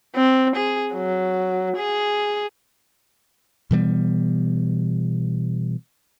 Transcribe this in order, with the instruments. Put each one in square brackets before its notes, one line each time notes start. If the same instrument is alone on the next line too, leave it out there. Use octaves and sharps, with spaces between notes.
[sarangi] C4
G#4
F#3
G#4
[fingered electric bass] B2 E3 G3 B3